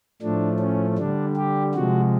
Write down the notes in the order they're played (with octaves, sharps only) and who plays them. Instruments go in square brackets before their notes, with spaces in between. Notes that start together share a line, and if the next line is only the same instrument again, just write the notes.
[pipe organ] A2 F3 A3 D4
C#4
D3 G3 D4
G4
C3 F3 G#3 F#4